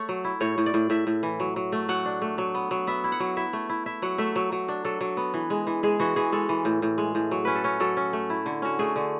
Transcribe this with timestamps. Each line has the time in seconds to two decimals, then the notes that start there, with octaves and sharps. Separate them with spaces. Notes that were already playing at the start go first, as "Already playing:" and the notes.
Already playing: A3 C#5
0.09 F#3
0.24 E4
0.40 A2 C#5
0.58 A2
0.66 D5
0.74 A2
0.90 A2 E5
1.07 A2
1.23 E3
1.40 F#3
1.56 F#3
1.72 A3
1.89 F#3 F#5
2.05 D4
2.22 A3
2.38 F#3
2.55 B3
2.71 F#3
2.87 B3 E5
3.04 E4
3.12 F#5
3.20 F#3
3.37 E4 E5
3.53 A3
3.69 E4
3.86 E4 E5
4.02 F#3 F#5
4.18 A3 E5
4.36 F#3
4.52 F#3
4.68 D4
4.85 F#3 A4
5.01 F#3
5.17 B3
5.34 E3
5.50 G#3
5.67 E3
5.83 G#3 G#4
6.00 E3 F#4
6.16 E3 G#4
6.32 G#3 A4
6.49 E3
6.65 A2
6.82 A2
6.98 G#3
7.15 A2
7.31 F#3
7.45 C#4 B4
7.55 A4
7.64 C#4
7.80 F#3 A4
7.97 C#4
8.13 A3
8.30 E4
8.46 D3
8.62 C#4 F#4
8.79 A3 G#4
8.96 D3